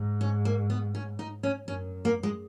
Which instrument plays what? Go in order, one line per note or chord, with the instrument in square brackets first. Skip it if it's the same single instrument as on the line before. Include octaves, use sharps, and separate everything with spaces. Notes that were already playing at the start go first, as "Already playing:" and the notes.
Already playing: [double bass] G#2
[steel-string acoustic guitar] C#4
A#3
B3
C#4
D#4
C#4
[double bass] F#2 [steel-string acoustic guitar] C#4
[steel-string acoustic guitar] A#3
G#3